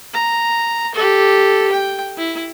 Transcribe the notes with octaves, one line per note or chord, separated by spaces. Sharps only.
A#5
G4 A4
G5
E4